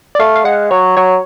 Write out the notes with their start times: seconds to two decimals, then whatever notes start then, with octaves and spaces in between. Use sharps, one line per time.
0.15 D5
0.19 A3 F5
0.36 F5
0.45 G#3 F#5
0.71 F#3 C#5
0.97 F#3 C#5